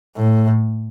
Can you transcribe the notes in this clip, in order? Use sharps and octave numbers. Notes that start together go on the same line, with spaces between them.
A2